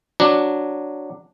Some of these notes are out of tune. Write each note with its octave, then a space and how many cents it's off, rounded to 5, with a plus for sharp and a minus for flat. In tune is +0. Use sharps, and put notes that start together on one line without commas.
F#3 +0 D4 +0